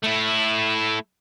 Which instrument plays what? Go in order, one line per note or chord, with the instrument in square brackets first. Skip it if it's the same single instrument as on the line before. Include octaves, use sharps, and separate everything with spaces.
[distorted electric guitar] A3 E4